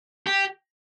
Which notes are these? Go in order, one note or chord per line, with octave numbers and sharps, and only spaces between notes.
G4